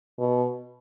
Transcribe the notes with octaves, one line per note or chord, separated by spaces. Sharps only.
B2